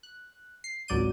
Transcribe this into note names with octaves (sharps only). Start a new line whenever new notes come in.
F#6
C7
G#1 C#2 F#3 D5 G6 D#7